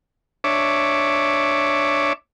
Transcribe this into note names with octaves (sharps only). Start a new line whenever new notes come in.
D4 C#5 E5 D6